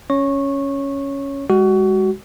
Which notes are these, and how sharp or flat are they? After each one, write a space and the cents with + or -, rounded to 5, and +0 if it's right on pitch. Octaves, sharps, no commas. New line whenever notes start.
C#4 +0 C#5 +0 C#6 -15
G#3 -25 F#4 +25